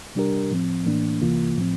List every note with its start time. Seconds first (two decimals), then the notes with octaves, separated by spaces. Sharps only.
0.15 C3 G3 D4 G4 A#4
0.51 A2 F3 C4
0.86 A2 E3 A#3 D4
1.21 C2 C3 E3 A#3 F4
1.57 A2 F3 C4